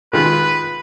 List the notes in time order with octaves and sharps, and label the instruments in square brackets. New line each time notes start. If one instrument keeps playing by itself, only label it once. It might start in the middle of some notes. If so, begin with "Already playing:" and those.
[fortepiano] D#3 G#3 F4 [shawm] B4